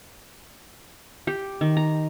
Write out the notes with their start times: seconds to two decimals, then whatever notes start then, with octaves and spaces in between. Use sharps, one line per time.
1.27 G4
1.61 D#3
1.77 A#5